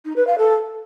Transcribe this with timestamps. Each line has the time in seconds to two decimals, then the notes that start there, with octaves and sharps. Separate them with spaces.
0.05 D#4
0.16 B4
0.27 F5
0.38 A4